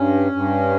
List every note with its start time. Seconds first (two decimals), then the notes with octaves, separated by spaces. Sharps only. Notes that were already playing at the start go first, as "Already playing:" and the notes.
Already playing: G2 C#4
0.32 G2